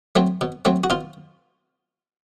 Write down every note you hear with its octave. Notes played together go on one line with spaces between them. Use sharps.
F#3 A3 C4
B2
F#3 A3 C4
F#4
B2 F4